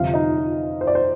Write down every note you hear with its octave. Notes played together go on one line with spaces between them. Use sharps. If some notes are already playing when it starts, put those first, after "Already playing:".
Already playing: G1 F2 C3 F4 F5
D#4 D#5
C5
D5
C5